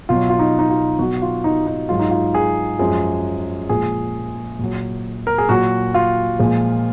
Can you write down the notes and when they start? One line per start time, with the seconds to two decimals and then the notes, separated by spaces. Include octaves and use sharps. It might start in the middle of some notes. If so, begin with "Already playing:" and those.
0.09 B2 F#3 F4
0.29 F4
0.39 D#4
0.59 D#4
0.70 F4
0.99 B2 F#3 F#4
1.22 F4
1.44 D#4
1.67 D#4
1.89 G#2 F#3 F4
1.99 D#4
2.11 F4
2.35 G#4
2.79 F#2 F3 G#3
3.69 A#2 F3 G#3 G#4
4.59 A#2 F#3
5.27 A#4
5.38 G#4
5.49 A#2 F#3 F#4
5.94 F4
6.39 A#2 F3 G#3